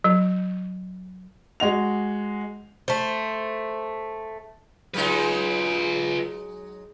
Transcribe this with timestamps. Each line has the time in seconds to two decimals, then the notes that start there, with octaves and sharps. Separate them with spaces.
0.04 F#3
1.60 G#3 F#4 F7
2.88 A3 C5
4.94 F#3 G#3 D#4 F4 B4